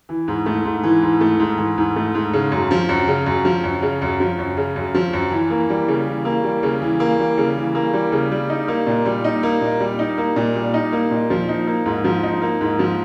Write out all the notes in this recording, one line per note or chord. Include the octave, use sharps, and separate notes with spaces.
E3
G#2
A3
G#2
E3
G#2
A3
G#2
E3
G#2
A3
G#2
C#3
F#2
F3
F#2
C#3
F#2
F3
F#2
C#3
F#2
F3
F#2
C#3
F#2
F3
F#2
E3
A#3
G3
C#3
E3
A#3
G3
C#3
E3
A#3
G3
C#3
E3
A#3
G3
C#3
G3
D#4
A#3
A#2
G3
D#4
A#3
A#2
G3
D#4
A#3
A#2
G3
D#4
A#3
A#2
F3
D#4
A#3
G#2
F3
D#4
A#3
G#2
F3